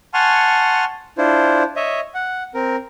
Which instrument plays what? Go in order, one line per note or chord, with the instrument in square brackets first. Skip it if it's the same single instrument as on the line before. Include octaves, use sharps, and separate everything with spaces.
[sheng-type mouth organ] F#5 G#5 A5 C6 C#6 F6
D4 E4 F4 C5
C#5 D#5 E5
F#5
C4 A#4